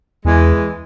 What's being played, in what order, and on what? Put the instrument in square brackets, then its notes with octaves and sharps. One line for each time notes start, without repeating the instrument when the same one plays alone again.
[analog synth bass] E2 [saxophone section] E3 G#3